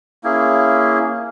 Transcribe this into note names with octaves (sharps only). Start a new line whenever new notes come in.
A#3 C#4 E4 G#4